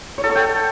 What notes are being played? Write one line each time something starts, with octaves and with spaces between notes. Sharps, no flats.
C#5
A4
C#6
G5